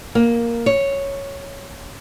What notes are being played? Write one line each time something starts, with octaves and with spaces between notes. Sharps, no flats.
A#3
C#5